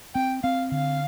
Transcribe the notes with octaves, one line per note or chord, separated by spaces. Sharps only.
C4 G5
C4 F5
D3 F5